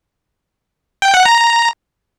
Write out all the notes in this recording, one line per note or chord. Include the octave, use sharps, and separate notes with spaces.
G5
F#5
A#5